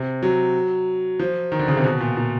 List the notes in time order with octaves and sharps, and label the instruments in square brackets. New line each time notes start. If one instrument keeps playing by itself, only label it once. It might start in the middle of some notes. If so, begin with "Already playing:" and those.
Already playing: [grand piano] C3
F#3
F3
D#3
D3
C#3
C3
B2
A#2
A#2